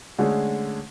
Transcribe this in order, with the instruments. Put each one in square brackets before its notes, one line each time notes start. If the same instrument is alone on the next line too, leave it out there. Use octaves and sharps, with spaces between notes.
[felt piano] D3 G#3 A3 C#4 G#4